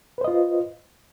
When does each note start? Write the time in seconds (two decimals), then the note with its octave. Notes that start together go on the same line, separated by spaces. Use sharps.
0.18 B4
0.21 C5
0.24 D#5
0.28 F4